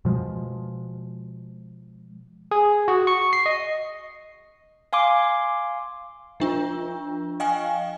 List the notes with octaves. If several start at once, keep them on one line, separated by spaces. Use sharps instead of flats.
B2 F3 G#3
G#4
F#4
C#6
C7
D#5
F5 G#5 C6 D6
F3 D4 F4
D#5 F5 G5 G#5